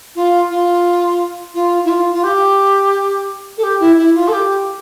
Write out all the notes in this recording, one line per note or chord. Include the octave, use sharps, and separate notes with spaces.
F4
F4
F4
E4
F4
F4
G4
A4
G4
E4
E4
F4
A4
G4